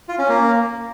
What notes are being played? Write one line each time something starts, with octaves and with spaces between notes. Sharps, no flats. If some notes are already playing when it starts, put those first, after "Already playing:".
F4
C#4
A#3